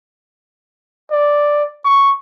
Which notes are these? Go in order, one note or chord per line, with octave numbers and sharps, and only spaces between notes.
D5
C#6